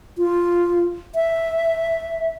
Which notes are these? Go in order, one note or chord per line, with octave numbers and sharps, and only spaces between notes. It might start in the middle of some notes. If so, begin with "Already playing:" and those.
F4
E5